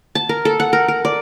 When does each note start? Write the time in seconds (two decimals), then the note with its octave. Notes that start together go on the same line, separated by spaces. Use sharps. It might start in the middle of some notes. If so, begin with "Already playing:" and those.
0.15 A5
0.29 A#4
0.45 A4
0.60 F#5
0.73 A#4
0.88 A#4
1.05 D5